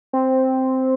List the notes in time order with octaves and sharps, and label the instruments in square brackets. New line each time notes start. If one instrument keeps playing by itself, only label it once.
[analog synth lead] C4